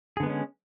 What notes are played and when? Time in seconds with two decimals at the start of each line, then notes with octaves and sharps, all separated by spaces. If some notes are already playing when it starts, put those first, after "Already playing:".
0.17 G#4
0.20 D3
0.23 B3
0.26 G#3
0.29 C#4